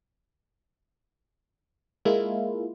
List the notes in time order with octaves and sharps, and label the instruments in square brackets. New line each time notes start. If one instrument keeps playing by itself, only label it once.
[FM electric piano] G#3 A#3 E4 F4